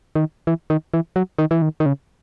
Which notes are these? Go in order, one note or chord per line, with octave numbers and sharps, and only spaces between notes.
D#3
E3
D#3
E3
F#3
D#3
E3
D#3
D#3
C#3